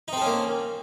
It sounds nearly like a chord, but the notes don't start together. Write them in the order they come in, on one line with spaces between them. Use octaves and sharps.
D#4 C4 A4 C#4 A#3